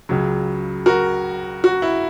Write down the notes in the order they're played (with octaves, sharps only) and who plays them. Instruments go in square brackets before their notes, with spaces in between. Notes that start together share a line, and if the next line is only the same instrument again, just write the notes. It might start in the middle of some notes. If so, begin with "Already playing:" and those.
[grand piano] C#2 C#3 F#3
F#4 A#4
F#4
E4